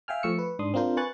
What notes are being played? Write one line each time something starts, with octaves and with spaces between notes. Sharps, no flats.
E5 F5 G5 G#5 F6
F3 A3 C#6 E6 C#7
B4
G#2 D4 C6 D#6
C4 D4 F4 A#4 C5
B4 G#5 C#6 F#6 A6